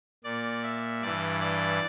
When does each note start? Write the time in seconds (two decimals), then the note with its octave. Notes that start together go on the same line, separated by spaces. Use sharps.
0.24 A#2 D5
0.63 E5
1.01 G2 E3 D5
1.40 D5